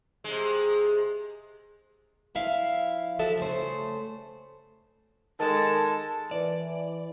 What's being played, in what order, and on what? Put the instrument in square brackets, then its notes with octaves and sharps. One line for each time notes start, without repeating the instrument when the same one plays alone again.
[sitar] C3 G#3
[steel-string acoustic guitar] F3 E4 E5 F5
F3 F#4 A4 E5
C#3 A3 C5
[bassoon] D#3 [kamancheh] G#3 A4 [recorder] A5
[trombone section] E3 [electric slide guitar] D5